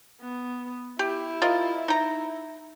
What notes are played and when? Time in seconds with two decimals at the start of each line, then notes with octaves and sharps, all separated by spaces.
0.22 B3
0.99 E4 G4
1.42 F4 A#4 D#5
1.88 D#4 A#5